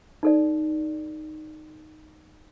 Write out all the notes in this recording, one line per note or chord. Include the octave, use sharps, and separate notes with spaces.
D#4 A4 D5